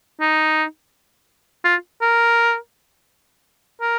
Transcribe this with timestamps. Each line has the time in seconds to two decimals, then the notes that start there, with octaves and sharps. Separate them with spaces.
0.21 D#4
1.64 F4
2.01 A#4
3.81 A#4